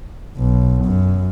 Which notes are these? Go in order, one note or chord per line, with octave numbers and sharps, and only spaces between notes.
B1
F#2